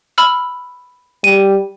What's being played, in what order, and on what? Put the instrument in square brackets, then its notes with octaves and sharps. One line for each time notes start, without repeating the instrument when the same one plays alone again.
[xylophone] B5 E6 F6
[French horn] G3 [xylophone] D#7